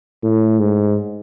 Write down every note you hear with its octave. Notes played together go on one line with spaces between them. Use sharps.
A2
G#2